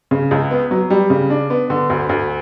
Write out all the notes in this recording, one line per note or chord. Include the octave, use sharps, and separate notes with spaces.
C#3
C#2
B3
F#3
G3
C#3
D4
B3
D3
D2
D2